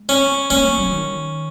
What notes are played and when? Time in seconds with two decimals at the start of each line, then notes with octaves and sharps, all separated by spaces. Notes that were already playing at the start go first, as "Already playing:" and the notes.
Already playing: G#3
0.09 C#4
0.50 A#3 C#4
0.65 F#3
0.78 F#3
0.92 D#3